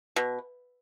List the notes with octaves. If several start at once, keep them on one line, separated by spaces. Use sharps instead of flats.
B2